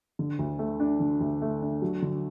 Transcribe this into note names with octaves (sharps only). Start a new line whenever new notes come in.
D3
D2
A3
D4
D3
D2
A3
D4
F#3
D3